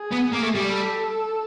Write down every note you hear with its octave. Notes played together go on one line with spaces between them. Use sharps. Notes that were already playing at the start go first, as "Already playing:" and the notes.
Already playing: G#4
B3
A#3
A3
G3
A4